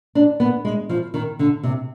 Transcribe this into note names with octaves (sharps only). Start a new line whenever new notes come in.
D4
B3
G#3
F3
D#3
D3
C3